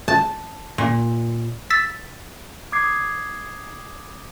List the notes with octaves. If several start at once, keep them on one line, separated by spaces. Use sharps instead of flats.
A5
A#2
E6 A6 B6
D6 D#6 G#6 C7